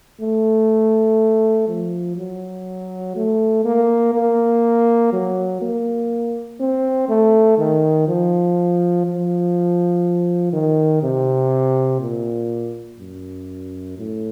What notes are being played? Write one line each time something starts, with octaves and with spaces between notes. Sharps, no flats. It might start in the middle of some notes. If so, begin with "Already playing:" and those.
A3
F3
F#3
A3
A#3
A#3
F#3
A#3
C4
A3
D#3
F3
F3
D#3
C3
A#2
F#2
A2